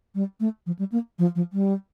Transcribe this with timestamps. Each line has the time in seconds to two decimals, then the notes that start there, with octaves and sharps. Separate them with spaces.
0.15 G3
0.40 A3
0.66 F3
0.79 G3
0.92 A#3
1.19 F3
1.35 F3
1.53 G3